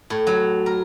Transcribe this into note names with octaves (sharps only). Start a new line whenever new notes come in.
A2
F#3
A#4